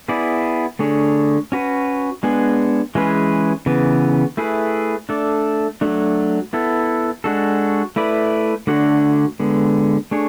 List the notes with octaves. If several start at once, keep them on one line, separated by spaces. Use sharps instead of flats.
B3 E4 G#4 D5
D3 A3 D4 G#4 C#5
C#4 F#4 B4
G#3 B3 D4 G#4
E3 G#3 C#4 G#4 B4
C#3 E3 B3
A3 E4 G#4 B4
A3 D4 A4 D5
F#3 A3 D4
B3 E4 A4
G#3 D4 F#4 A4
A3 E4 B4 D5
D3 A3 D4 F#4 C#5
D3 G#3 B3
A3 D4 G#4 C#5